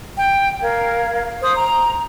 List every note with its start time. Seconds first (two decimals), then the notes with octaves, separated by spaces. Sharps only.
0.18 G5
0.62 A#4 F5 G#6
1.42 C5 D#6
1.56 A#5